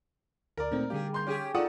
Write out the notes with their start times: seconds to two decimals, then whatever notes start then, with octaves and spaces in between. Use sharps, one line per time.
0.58 D2 A#4 D5
0.72 A#2 A3 C4 D#4
0.90 D3 G3 G4 G#4 F5
1.14 A#3 C6 G6
1.27 C#4 G4 G#4
1.55 D#4 F4 A4 D5 F#5 C#6 D#6